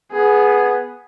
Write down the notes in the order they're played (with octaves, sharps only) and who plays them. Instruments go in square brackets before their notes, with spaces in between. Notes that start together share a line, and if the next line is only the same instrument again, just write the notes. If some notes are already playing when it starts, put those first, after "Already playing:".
[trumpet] B3 [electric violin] G#4